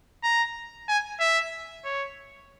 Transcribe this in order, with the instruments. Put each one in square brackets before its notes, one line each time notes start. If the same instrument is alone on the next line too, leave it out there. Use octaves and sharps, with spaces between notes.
[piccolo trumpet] A#5
G#5
E5
C#5